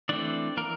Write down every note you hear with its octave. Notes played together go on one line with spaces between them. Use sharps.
E3 A3 C4 D4 D5
E3 A#3 A#4